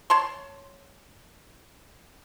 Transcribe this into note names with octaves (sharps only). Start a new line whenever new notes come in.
C#5 A5 C6